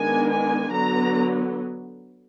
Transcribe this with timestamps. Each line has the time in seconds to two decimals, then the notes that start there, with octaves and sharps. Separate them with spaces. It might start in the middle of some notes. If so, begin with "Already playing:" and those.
Already playing: D#3 G#3 B3 D4 G#5
0.30 G#5
0.73 D3 F#3 B3 A#5